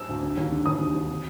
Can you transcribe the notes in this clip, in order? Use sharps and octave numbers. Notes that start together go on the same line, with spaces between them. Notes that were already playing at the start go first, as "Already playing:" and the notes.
Already playing: E6
D2
D3
D#2
D3
D#2 D#6
D3
D#2
C3